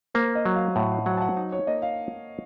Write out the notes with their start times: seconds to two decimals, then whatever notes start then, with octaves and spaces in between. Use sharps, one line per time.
0.14 A#3 C5
0.35 D#5
0.45 F#3
0.56 F5
0.76 A2 F#5
0.91 F#5
1.06 F#3 F#5
1.17 A5
1.22 F#5
1.37 D#4
1.52 C#5
1.67 A#3 D#5
1.82 F5